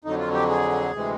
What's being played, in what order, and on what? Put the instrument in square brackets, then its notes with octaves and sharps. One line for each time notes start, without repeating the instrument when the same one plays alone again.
[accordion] F2 D3 F#3 D#4
F4
G4
G#4
D2 C3 E3 G#3